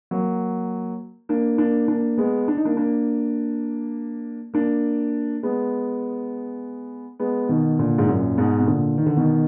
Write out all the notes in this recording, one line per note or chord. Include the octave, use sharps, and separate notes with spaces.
F#3 A#3
A#3 D4
A#3 D4
A#3 D4
G#3 B3
D4
D#4
A#3 D4
A#3 D4
A#3 D4
G#3 B3
G#3 B3
B2 D#3
A#2 D3
G#2
F#2 A#2
G#2 B2
B2
A#2 D3
D#3
D3
B2 D#3